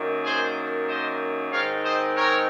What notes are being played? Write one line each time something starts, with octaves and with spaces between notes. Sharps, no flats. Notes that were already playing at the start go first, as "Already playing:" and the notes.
Already playing: F#2 D#3 A#3
G#4 C5
C5 D#5
G#2 D#3 G#3 C4 C#5 F5
C5 D#5
A#4 C#5